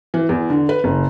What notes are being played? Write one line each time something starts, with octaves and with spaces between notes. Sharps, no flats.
E3
E2
D3
B4
F#1